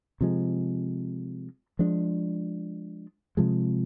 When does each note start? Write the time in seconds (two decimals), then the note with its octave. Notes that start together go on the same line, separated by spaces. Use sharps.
0.21 C3 F3 G#3
1.79 F3 G#3 D4
3.37 C3 F3 G#3